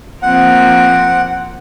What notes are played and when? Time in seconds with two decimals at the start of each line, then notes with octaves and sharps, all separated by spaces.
0.22 F3 A#3 C4 F#5